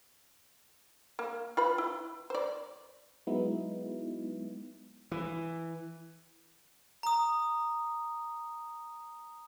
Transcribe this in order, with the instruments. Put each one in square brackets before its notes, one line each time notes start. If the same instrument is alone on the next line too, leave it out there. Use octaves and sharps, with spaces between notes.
[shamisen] A#3
F4 B4 B5
E4
C5 D5
[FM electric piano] F#3 G#3 B3 D#4 E4 F#4
[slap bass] E3
[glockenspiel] A#5 D#6